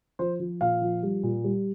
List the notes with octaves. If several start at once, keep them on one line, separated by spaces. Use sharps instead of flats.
F3 C5
F3
A#2 F5
F3
G3
A#2
G3